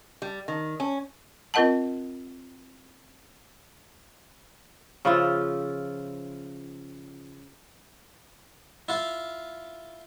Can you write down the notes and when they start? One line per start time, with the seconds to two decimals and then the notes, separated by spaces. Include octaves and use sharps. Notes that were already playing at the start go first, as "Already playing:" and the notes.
0.22 G3
0.48 D#3
0.80 C#4
1.54 C4 F4 A#4 D#5 F#5 A5
5.05 C#3 F3 E4 F4
8.88 E4 F4 F5